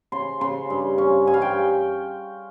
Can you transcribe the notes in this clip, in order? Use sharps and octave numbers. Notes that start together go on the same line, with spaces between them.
C#3 C6
C#3 C6
G2
C#4
G2 G#5
F5
G5